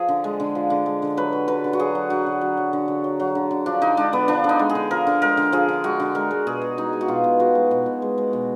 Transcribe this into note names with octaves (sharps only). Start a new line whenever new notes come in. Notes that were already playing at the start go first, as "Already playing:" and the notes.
Already playing: F3 G#4
D3
G#3
D3
F3
D3
G#3
D3
F#3 B4
F#3
D3 B4
D3
F#4
F#3 G#4
F#3
D3 F#4
D3
F#3
F#3
D3
D3
F#3
F#3
D3
D3
F3 D4
D3 D#4
G#3 D4
D3 B3
F3 D4
D3 D#4
G#3
G#4
D3
F3 A#4
D3
G#3 A#4
D3
F3 G#4
D3
G#3 F#4
D3
G#3 A#4
G#3
B2 G#4
B2
G#3 D#4
G#3
F#4
B2 F4
B2
G#3 F#4
G#3
B2
B2
G#3
G#3
B2